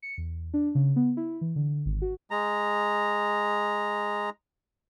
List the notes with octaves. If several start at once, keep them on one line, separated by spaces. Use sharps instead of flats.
C#7
E2
D4
C#3
B3
E4
E3
D3
G#1
F#4
G#3 A#5